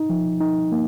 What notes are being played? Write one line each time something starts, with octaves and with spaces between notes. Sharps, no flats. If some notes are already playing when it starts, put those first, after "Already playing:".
Already playing: D#4
F3
D#4
A#3